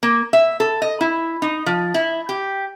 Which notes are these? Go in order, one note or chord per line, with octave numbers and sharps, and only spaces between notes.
A#3
E5
A4
D#5
E4
D#4
F3
E4
G4